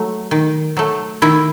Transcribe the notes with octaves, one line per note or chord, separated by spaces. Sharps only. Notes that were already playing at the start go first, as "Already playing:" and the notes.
Already playing: F#3 A3
D#3
F#3 A3
D#3 E4